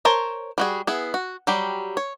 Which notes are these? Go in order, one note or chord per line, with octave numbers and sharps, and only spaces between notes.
A#4 C5 C#5 A5
G3 F#4 G#4
B3 E4 G#4
F#4
F#3 G3 G4
C#5